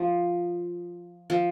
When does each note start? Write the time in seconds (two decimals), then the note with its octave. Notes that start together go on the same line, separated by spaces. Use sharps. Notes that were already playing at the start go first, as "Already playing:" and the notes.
Already playing: F3
1.30 F3